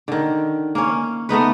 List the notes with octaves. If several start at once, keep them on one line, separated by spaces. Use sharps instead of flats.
D3 D#3
A#3 C#4
A3 B3 D#4 B4